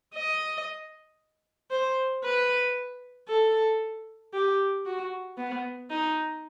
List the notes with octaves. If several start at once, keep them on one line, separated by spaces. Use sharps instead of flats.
D#5
C5
B4
A4
G4
F#4
B3
D#4